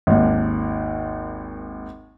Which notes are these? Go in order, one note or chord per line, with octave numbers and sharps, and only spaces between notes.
G#1 D#2